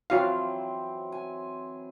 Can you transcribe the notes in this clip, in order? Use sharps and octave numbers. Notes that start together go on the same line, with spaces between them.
E3 F#3 C4 F4 F#4 F5
G#5